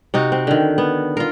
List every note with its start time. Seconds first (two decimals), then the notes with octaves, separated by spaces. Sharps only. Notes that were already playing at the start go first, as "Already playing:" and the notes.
0.14 C3 D#4 F#4
0.32 C4
0.47 D3 D#3
0.78 B3
1.17 F4 A#4